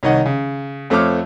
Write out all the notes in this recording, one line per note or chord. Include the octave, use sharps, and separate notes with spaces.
C2 D#3 C#5 D#5 F#5
C#3
F2 A3 C4 C#5 D6 F6